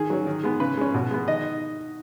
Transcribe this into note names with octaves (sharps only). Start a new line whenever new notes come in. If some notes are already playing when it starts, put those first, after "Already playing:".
Already playing: D#3 G#4
F#3 C#4
D#3
G#3 B3
C#3 B4
G#3 C#4
B2
G#3 B3
D#3 D#5